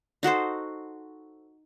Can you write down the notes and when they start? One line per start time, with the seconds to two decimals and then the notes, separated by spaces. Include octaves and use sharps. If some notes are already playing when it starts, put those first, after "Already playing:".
0.23 D#4 F#4 A4 C5